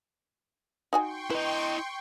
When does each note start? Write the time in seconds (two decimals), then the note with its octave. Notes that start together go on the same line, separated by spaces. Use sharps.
0.93 D#4 F#4 G5 G#5 C6 C#6
1.30 E4 B4 D#5